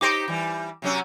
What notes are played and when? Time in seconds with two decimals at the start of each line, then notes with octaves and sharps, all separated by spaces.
0.01 D#4 G4 C5 D6 A#6 D7
0.28 E3 G3
0.82 C3 F#3 C#4